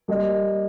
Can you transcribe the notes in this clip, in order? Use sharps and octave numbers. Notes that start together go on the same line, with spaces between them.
G3 A#3 G4 D#5